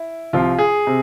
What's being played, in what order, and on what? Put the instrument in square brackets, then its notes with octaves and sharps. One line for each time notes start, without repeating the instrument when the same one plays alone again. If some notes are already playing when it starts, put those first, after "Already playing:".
Already playing: [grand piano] E4
C2 C3 F3 F4
G#4
C3